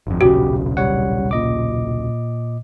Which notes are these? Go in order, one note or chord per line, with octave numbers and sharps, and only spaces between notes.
G1 F2
D#1 B1 C#3 F#4 G4
G3 C#5 F#5
A#2 D#5 D6